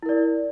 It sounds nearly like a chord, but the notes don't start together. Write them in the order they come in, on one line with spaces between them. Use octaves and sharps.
E4 A#4 D5